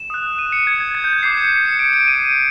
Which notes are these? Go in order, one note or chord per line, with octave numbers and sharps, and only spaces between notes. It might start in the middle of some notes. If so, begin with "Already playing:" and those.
Already playing: E7
D#6 F#6
D#7
C#7
G#6
G#6
G#6
G6
G#6
D6 G6 C7
C#7
C#7
D7
D7
D#7